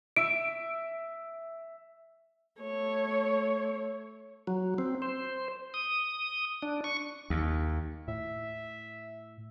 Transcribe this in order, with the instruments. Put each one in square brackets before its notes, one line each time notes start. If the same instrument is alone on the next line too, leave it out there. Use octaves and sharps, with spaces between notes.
[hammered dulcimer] E5 [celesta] D7
[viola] A3 C#5
[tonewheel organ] F#3
C4
C5
D#6
D4
C#6
[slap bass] D#2
[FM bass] A2 [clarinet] E5